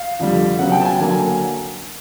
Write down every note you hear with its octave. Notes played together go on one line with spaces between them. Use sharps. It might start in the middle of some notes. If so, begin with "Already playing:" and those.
Already playing: F5
F2 D3 G3
C#3 F#3 B3 F#5
G5
A5
G#5
D3 F#3 A#3 G#5
G#5